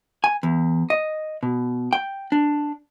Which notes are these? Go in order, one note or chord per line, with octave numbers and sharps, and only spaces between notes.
G#5
E2
D#5
B2
G5
D4